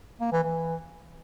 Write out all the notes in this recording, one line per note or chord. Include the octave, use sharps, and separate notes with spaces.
A#3
E3
E3